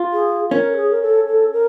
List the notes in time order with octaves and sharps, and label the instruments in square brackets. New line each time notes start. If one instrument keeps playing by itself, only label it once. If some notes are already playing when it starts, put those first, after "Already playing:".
Already playing: [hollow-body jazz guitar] F4
[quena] G#4
[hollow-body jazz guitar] C#4 [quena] A#4
[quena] A4
G#4
A#4
A4
A4
A#4